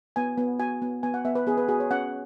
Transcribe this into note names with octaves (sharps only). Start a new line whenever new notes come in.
B3 G#5
B3
F#4 G#5
B3
B3 G#5
F#5
B3 E5
B4
B3 G#4
B4
F#4 G#4
C#5
C#4 F#5